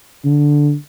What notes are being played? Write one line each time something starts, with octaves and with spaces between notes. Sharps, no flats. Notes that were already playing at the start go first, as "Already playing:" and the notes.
D3